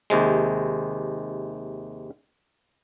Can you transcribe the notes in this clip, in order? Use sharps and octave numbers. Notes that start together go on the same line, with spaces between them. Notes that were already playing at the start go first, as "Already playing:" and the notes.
D#2 C3 G#3